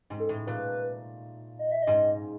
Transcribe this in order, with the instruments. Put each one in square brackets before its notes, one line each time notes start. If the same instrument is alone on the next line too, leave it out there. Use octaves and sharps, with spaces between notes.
[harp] G#2
[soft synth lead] A4
[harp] A2
[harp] A#2 [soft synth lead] B4
[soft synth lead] D#5
E5
[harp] G#2 [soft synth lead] D#5